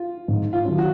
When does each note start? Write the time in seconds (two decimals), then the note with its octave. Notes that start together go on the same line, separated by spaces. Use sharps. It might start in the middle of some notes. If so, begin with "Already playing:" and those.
Already playing: F4
0.28 G#2
0.53 F4
0.65 D#3 F#3 C#4
0.78 F#4